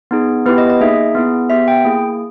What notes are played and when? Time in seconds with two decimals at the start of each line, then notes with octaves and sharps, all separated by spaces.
0.11 B3 D#4 G#4
0.46 B3 E4 G4 B4
0.58 D#5
0.70 D#5
0.81 A#3 D#4 G#4 E5
1.15 B3 E4 G#4
1.50 B3 G4 E5
1.68 G5
1.85 A#3 E4 G#4